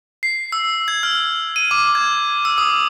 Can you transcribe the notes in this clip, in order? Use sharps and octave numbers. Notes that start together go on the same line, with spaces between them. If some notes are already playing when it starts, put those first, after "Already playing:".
C7
E6
G#6
F6
D#7
D6
G#6
E6
D#6